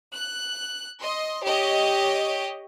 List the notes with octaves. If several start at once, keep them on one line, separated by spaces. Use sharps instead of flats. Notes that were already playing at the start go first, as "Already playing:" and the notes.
F#6
D#5 C6
G4 C#5 D#5